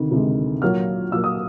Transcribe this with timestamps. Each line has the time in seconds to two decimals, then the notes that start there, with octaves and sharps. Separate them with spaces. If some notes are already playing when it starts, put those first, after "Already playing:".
Already playing: D2 C3 D#3
0.11 D2 C3 D#3 G#3
0.62 A#2 F#3 A#3 F6
1.12 A#2 F#3 A#3 E6
1.24 D#6